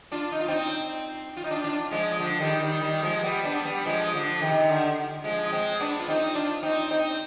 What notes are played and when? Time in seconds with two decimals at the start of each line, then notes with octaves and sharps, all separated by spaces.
0.12 D4 F4
0.32 D#4
0.40 F4
0.48 C4 D#4
1.37 F4
1.44 D#4
1.51 D4 F4
1.64 D4 F4
1.91 F3 G#3
2.19 D3 F3
2.40 D#3 G3
2.60 D#3 G3
2.81 D#3 G3
3.02 F3 G#3
3.23 G3 B3
3.44 B3 D4
3.65 G3 B3
3.86 F3 G#3
4.14 D3 F3
4.41 C3 D#3
4.69 D3
5.24 F3 G#3
5.52 G#3 C4
5.80 B3 D4
5.99 F4
6.08 C4 D#4
6.35 D4 F4
6.63 C4 D#4
6.91 C4 D#4